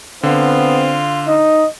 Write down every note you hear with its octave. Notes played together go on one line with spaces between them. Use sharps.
D3 B3 C4 F4
D#4 D#5